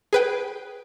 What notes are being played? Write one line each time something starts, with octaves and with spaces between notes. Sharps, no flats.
G#4 B4 G5